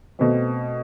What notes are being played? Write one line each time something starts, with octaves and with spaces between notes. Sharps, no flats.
B2 A3 C4